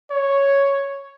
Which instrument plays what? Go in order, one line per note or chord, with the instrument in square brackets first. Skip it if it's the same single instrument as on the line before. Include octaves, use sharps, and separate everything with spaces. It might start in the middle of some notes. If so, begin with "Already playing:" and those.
[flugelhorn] C#5